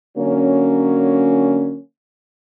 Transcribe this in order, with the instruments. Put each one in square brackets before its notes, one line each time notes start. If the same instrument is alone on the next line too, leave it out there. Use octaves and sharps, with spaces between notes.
[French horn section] D3 F#3 A#3 C#4